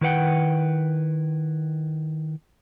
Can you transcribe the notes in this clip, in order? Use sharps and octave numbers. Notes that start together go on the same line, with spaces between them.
D#3 E4 B4 F#5 G5